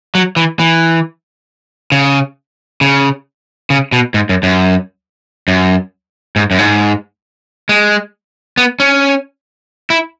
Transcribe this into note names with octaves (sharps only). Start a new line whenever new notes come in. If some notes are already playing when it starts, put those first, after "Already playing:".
F#3
E3
E3
C#3
C#3
C#3
B2
G#2
F#2
F#2
F#2
G#2
F#2
G#2
G#3
B3
C#4
E4